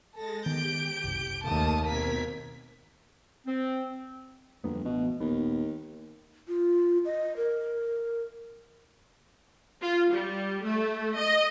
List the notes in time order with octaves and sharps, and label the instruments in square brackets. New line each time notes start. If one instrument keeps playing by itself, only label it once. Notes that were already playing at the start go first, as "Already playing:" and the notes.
[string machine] G#3 A6 A#6 [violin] A4
[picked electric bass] D#3 B3 [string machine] G4 [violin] G6 D7
[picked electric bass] F#1 C2
[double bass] D#2 [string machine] A3 A#3 [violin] A5 D#6
[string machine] B2 C4 G#6 [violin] A#4 B6
[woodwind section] C4
[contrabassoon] G1 [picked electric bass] F2 A#3 B3
[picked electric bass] A1 [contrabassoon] B2
[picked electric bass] D#1 B3 [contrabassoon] D#2
[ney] F4
D#5
A#4
[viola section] F4
G3
A3
D#5